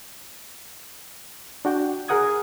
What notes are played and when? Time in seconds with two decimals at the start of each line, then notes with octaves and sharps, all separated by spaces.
1.65 D4 F#4 G5
2.08 G#4 A#4 F#5 D#6 G#6